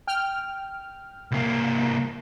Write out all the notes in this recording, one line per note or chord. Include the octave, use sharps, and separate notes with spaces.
G5 F6
C2 A#3